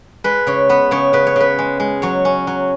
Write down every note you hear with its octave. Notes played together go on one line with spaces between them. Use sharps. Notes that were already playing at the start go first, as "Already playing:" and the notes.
G#3 B4
C#3 C#5
B3 B4
C#3 C#5
C#3 B4
C#5
C#3 B4
G#3
G#3
F#3 C#5
C#4
F#3